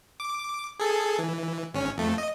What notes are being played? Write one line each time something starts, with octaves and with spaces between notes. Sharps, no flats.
D6
G#4 A4
E3
G#1 C#4
F2 A3
D#5